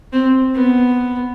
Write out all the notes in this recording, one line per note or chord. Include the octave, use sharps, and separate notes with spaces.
C4
B3